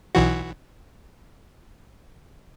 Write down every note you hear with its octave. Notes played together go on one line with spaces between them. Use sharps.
B1 E3 F#4